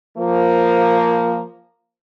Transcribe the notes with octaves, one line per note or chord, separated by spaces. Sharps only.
F3 A#3